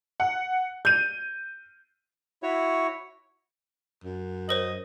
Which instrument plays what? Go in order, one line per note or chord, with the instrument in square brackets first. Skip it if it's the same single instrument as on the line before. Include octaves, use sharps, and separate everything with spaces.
[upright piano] F#5
G6 D#7
[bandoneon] E4 F#4 C#5
[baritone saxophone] F#2
[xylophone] A#4 C5 C#5 [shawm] D#5